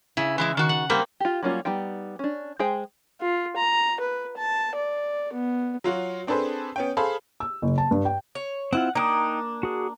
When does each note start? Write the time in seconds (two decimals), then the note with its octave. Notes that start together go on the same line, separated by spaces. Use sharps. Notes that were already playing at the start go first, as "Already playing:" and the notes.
0.17 C#3 E4
0.38 E3 G#3 E4
0.57 D#3 F#4
0.69 F#5
0.90 G3 A#3 C4
1.20 F4 G4
1.43 F#3 G3 A#3 C#4 F4
1.65 G3 B3 D#4 G5
2.19 C#4 D4
2.59 G#3 G#4 C5 G5
3.21 F4
3.56 A#5
4.00 B4
4.37 A5
4.75 D5
5.33 B3
5.84 F#3 F4 F#4
6.27 C4 D4 G#4 A4 B4 C5
6.76 B3 C#4 G5
6.97 G#4 A4 C5 F5 B5
7.40 E6
7.62 F#1
7.78 A5
7.91 G2
8.05 G5
8.35 C#5
8.73 C4 E4 F4 F#5
8.95 A#3 D4 D#4 G5 D#6
9.63 F#4 G#4